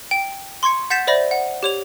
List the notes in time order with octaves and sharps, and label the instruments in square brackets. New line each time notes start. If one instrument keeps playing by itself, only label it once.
[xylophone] G5
C6 C#6 G#6 C#7
F#5 G6 A6 B6 C7 E7
C5 D5 E5 B5 A#6
F#5
G4 C#5 F7